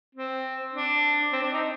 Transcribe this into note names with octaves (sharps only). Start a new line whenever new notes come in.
C4
D4
C4
D4
D#4